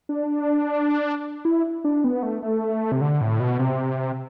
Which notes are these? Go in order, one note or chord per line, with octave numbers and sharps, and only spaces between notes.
D4
E4
D4
B3
A3
A3
C3
D3
A2
B2
C3